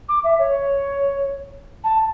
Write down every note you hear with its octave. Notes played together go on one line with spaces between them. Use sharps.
D6
E5
C#5
A5